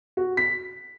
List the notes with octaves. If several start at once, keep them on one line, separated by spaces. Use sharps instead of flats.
F#4
B6